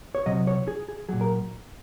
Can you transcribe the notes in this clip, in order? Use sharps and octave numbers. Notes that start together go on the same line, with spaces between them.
C#5
C3 F#3 D#5
C#5
G#4
G#4
A#2 F#3 G#4
A#4